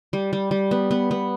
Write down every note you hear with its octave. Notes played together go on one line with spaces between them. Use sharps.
G3
G3
G3
B3
B3
B3